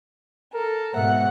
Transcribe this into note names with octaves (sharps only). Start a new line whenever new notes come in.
A4 A#4
G#2 B2 E5 F#5